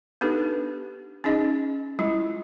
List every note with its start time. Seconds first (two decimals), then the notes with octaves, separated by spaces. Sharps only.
0.21 B3 D4 D#4 G4 A4 B4
1.24 C#4 D#4 G#4 D#5
1.99 G3 G#3 E4 F4